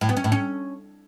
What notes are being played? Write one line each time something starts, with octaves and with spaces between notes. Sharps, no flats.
A2
B3
C#4
A2
C#4